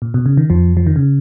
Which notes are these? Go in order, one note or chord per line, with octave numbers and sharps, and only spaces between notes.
A#2
B2
C#3
D#3
F2 F3
F3
D#3
C#3